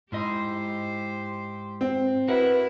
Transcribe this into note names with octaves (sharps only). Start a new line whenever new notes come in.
G#2 E4 G4 C5 D#5
C4
E4 F#4 A#4 B4 F#5